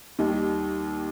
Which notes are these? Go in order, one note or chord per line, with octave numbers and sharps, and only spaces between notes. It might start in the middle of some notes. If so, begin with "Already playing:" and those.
D#2 D#3 G3